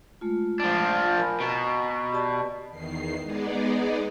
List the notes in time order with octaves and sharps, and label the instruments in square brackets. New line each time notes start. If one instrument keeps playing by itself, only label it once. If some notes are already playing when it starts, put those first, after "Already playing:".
[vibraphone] G#3 A3 F4
[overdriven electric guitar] F3 D4
[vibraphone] A#4 G#5 B5
[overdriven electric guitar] B2 [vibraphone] A#5
[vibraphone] G4 D5 A5
[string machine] E2 D#3 C7
G#3 B3 D#4 G#4 D5